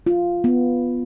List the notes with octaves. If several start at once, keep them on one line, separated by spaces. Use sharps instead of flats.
F4
B3